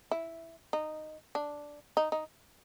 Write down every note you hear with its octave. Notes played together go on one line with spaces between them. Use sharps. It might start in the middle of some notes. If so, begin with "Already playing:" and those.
E4
D#4
D4
D#4
D#4